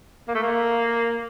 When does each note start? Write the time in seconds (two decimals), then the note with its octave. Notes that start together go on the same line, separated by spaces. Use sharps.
0.28 A#3
0.35 A3
0.43 A#3